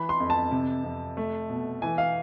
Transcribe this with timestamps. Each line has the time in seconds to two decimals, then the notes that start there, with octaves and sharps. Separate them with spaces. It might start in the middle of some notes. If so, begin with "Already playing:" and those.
Already playing: E3 B5
0.09 C6
0.20 F2
0.30 A5
0.51 C3
0.84 F2
1.17 A3
1.50 B2
1.82 E3 G#5
1.98 F5